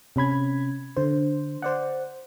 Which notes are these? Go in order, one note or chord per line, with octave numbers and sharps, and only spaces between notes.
C3 C#4 B5 G#6
D3 C5
C5 D5 F#5